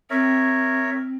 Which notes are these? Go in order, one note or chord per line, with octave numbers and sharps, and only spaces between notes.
C4 A#4 C#5 E5